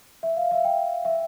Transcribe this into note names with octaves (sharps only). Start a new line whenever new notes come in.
E5
F5
E5
G5
E5